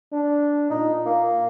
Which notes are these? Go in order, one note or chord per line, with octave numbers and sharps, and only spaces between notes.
D4
A#2 D#4
A#3